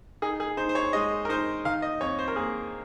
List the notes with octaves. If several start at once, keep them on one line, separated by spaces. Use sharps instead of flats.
D#4 G#4
G#4
D#4 C5
C5
C#5
G#3 D#5
A#4
D#4 C5
D#3 F5
D#5
F2 C#5
C5
A#4
A#3 G#4